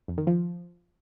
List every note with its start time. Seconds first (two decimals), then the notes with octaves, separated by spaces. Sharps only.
0.08 F2
0.18 D#3
0.27 F3